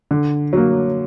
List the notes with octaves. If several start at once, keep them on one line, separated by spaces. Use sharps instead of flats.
D3
F#3 A#3